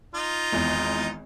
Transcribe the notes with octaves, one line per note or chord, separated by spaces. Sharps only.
D#4 F4
G#1 E2